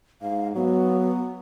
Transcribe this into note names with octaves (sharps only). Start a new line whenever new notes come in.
G#2 F5
F#3 B3